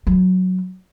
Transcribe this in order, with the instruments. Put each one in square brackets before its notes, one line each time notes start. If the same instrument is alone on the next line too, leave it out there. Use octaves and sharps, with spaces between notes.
[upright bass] F#3